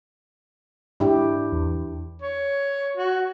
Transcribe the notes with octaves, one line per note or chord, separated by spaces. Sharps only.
G#2 D4 E4 G4
E2
C#5
F#4